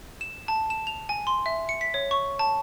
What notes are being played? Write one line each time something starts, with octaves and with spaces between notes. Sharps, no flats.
E7
A5
E7
F7
G#5
C6
E5
C#7
B6
C#5
C#6
A5